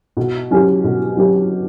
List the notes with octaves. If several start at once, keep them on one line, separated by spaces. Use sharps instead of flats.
B2
F#3 C#4 G4
B2
F#3 C#4 G4